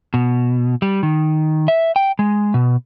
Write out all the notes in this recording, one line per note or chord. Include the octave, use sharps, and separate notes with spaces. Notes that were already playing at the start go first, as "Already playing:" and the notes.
B2
G3
D#3
E5
G5
G#3
B2